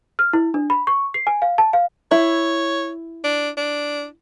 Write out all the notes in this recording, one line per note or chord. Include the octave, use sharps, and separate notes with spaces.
F6
E4
D4
B5
C#6
C7
G#5
F5
A5
F5
E4 C#5
D4
D4